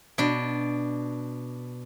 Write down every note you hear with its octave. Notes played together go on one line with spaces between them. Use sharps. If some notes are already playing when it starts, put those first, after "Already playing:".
B2 D4